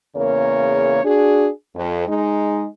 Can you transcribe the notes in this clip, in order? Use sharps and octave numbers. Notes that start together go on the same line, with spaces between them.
E2 C#3 A#3 A#4 C#5
D4 F#4 G#4
F2
G#3 D#4